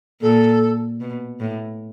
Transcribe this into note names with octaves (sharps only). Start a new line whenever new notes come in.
A#2 A4
B2
A2